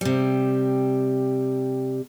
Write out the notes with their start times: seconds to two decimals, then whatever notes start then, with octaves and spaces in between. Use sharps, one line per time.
0.01 C3 G3